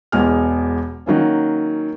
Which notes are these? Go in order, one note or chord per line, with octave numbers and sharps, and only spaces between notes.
E1 E2 G#3 G#5 F6
D#3 F#3 A#3 C#4